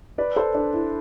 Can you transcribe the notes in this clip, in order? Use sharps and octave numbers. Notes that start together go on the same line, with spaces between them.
B4 D5
A4 C5
D4
E4